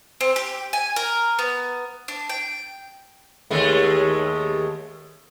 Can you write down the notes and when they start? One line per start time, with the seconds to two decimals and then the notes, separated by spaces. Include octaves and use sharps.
0.21 C4
0.36 G4
0.73 G#5
0.96 A#4
1.39 B3
2.08 D4
2.29 G5
3.50 D#2 G#3 A3